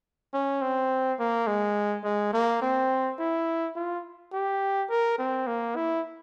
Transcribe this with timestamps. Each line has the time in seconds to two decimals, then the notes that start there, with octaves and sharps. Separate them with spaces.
0.34 C#4
0.62 C4
1.19 A#3
1.47 G#3
2.04 G#3
2.33 A#3
2.62 C4
3.19 E4
3.76 F4
4.33 G4
4.90 A#4
5.19 C4
5.47 A#3
5.76 E4